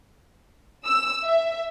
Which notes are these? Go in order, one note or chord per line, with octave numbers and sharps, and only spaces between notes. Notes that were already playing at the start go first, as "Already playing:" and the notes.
E6
E5